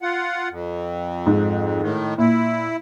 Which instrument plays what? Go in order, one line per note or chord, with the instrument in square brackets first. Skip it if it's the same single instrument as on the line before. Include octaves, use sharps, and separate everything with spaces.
[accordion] F4 F#5
F2
[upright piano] G#2
[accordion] A2 D#3
[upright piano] A#2 [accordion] E4